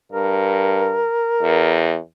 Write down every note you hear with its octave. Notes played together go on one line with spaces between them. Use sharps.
G2 A#4
E2